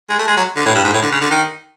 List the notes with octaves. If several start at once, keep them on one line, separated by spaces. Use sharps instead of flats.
G#3
A3
G#3
F#3
D3
A2
G2
G#2
A2
D3
C#3
D3
D#3